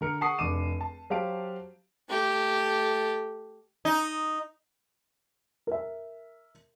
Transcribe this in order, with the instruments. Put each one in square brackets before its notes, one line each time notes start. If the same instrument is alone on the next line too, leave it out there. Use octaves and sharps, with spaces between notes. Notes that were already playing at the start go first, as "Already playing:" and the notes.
[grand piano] D3 A#4 C#7
F#5 A5 C#6 D#6 C7
F1 D4 D6 D#7 E7
A5
F#3 G4 C5 F5 A5 D7
[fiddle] A3 G4
[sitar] D#4
[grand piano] A#4 E5